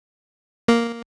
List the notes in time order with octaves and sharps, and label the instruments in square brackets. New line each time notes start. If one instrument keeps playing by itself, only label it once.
[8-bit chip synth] A#3